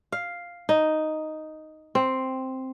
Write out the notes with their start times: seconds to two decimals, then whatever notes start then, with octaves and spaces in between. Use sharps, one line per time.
0.12 F5
0.69 D#4
1.95 C4